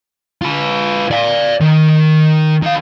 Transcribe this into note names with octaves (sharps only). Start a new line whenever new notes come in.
F4 B4
D5 F5
D#3
D#3 F5